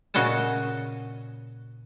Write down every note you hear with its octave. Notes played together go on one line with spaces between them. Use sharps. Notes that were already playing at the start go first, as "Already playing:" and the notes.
A#2 C#3 F#4 D#5 G#5 A5